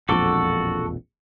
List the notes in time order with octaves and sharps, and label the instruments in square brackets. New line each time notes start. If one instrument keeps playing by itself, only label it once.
[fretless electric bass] E1 A#1 F2 [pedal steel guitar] F#4 A4 D6